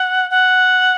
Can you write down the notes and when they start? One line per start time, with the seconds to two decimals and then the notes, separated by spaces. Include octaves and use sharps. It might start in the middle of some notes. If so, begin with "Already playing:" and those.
Already playing: F#5
0.31 F#5